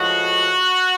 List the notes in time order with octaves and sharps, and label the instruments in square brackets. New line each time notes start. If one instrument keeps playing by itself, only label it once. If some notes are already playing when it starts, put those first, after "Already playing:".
Already playing: [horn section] A2 F3 G#3 F#4